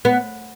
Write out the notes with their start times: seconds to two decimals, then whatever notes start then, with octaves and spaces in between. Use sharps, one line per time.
0.05 B3